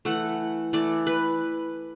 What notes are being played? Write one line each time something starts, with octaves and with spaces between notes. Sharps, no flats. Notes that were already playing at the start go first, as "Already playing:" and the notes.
E3 A3 F#5
E3 A3 D5
B4